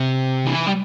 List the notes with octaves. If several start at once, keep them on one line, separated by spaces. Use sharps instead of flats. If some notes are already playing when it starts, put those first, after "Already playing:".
Already playing: C3
E3
G3